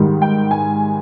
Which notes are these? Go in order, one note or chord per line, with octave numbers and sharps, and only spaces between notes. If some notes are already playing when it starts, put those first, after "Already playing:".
Already playing: G#2 D#3 G3
G5
G#5